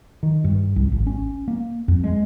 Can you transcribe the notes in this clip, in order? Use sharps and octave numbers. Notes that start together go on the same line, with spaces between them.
D#3
G2
C2
G#1
C#4
A#3
F2
G#3